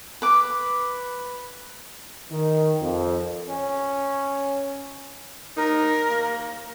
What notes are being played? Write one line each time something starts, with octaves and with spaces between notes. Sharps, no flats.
B4 D6
D#3
F2
C#4
D#4 A#4
A#3